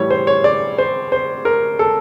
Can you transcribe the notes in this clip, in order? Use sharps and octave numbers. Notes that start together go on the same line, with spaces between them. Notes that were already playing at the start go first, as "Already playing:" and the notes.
Already playing: A2 E3 G3 C#5
C5
C#5
D5
C5
C5
A#4
A4